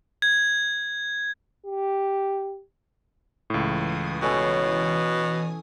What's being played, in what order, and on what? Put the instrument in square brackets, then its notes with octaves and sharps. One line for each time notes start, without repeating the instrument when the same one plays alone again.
[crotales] G#6
[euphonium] G4
[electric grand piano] C#2 A2 [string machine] E3 G#5 D#6
[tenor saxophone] B2 [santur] C#4 A4